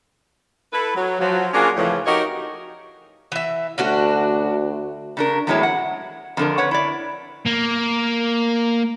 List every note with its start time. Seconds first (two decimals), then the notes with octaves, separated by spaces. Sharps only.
0.72 E4 A4 B4
0.95 F#3
1.19 F3 F#3
1.53 A#3 C#4 D4 F4 F#4 G#4
1.76 F2 A2 C#3 E3 F3
2.06 D#4 F#4 G4 A#4 C#5 D#5
3.32 E3 E5
3.78 D2 C#4 D4 F#4
5.17 C#3 D4 A#4
5.47 E2 A2 F#3 G#3 E4 C#5
5.63 F#5
6.37 F2 D3 A#4
6.58 B4 C#5 F#5
6.71 E4 D5
7.46 A#3